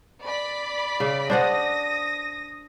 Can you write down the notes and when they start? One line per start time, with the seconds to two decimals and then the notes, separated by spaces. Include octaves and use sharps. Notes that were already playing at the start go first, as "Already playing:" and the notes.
0.24 D5 B5
1.00 C#3
1.30 D4 C5 F#5 D#6 A#6